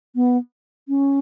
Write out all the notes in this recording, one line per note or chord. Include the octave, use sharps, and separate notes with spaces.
B3
C#4